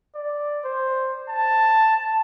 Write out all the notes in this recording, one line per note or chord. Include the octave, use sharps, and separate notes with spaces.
D5
C5
A5